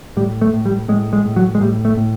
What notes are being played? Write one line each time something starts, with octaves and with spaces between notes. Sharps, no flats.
A2 G3
A3
A2
G3
A2 G#3
G#3
A2
F#3
G#3
A2 G3
A3
A2